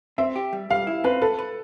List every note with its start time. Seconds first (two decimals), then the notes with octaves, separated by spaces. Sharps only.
0.18 C4 E5
0.36 G4
0.53 G3
0.70 G3 F5
0.87 E4
1.04 C4 B4
1.21 A4 B4
1.39 B4